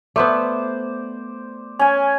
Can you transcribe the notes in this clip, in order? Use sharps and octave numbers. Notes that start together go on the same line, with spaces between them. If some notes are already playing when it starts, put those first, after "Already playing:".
A3 B3 C5 D5
C#4 G#5